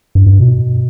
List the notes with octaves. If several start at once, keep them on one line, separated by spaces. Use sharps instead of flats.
G2
G2
B2